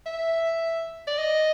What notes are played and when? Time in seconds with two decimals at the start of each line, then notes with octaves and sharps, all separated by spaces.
0.06 E5
1.07 D5
1.18 D#5